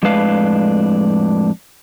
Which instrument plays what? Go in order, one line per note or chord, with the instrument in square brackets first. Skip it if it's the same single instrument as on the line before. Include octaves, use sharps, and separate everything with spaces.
[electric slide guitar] F2 A2 G#3 D4 B4 F5